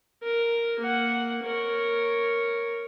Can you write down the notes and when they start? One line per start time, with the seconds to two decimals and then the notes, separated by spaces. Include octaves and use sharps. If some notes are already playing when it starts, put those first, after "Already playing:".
0.23 A#4
0.79 A#3 F#5
1.44 A#4 C#5